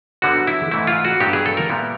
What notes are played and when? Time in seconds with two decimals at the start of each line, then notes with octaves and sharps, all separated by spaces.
0.22 F#2 D3 G3 B3 F#4
0.47 E4
0.71 G#2 E3 A3 E4
0.87 F4
1.05 F#4
1.20 G2 D3 F#3 B3 G4
1.33 G#4
1.46 A4
1.57 A#4
1.69 A#2 G3 B3 E4